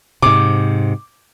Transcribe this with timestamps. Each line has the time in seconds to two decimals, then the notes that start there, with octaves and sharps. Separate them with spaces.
0.22 G#2 C3 D6